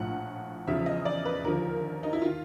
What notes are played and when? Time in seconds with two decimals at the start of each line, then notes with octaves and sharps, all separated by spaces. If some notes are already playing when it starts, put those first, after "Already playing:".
Already playing: A#1 A2 F3 F#5
0.67 E2 C#3 F3 E5
0.86 D#5
1.05 D5
1.25 B4
1.44 D#2 D3 F3 A#4
2.03 D#4
2.13 E4
2.22 D#3 F4